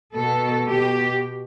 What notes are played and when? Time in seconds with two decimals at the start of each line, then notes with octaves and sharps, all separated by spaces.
0.14 B2 A4
0.67 B2 G4